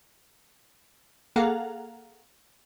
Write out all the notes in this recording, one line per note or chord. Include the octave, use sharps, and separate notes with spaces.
A#3 G#4 A4 F5 F#5 A#5